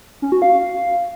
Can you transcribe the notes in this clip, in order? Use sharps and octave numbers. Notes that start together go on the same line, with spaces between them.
C#4
F#4
F5